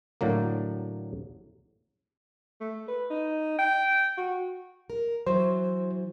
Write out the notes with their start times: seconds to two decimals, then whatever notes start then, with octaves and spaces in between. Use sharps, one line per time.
0.21 A2 D3 F#3 A#3
2.60 A3
2.88 B4
3.10 D#4
3.59 G5
4.17 F#4
4.90 A#4
5.27 E3 F#3 C5